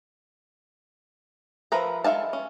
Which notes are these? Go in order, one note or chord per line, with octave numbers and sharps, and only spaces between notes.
F3 A#4 B4 E5 A#5
G#3 A4 E5 F5 A5
C#4